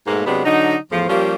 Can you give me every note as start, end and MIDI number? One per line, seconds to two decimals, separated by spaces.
0.07 0.26 44
0.07 0.26 47
0.07 0.26 57
0.07 0.26 58
0.27 0.41 48
0.27 0.41 54
0.27 0.41 56
0.27 0.41 59
0.27 0.41 62
0.45 0.76 50
0.45 0.76 54
0.45 0.76 63
0.92 1.06 40
0.92 1.06 45
0.92 1.06 53
1.09 1.35 53
1.09 1.35 55
1.09 1.35 58
1.09 1.35 61
1.09 1.35 67